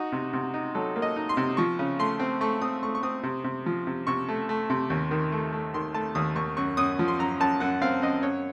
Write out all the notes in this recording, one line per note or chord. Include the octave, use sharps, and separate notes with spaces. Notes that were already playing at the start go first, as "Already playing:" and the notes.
Already playing: D#4 F#4
C3
C3
D#4
F#3 A4
A#3
D#5
D#4
C6
C3
F3 C#6
C#3
A3 C6
C4
A3 C#6
C4 D#6
A3 C#6
C#6
C4 D#6
C3
C3
F3
C3
C3 C#6
A3
A3
C3
D#2
D#3
A3
A3
D#3 C6
A3 A5
D#2 D#6
D#2 C#6
F#2 C#6
F#2 D#6
F3
C6
F#2 A#5
F#2 A5
F#2 F#5
C4 F5
F#2 D#5
F#2 C#5